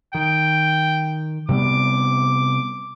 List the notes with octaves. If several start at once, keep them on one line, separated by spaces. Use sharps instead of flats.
D#3 G5
C3 G3 B3 D6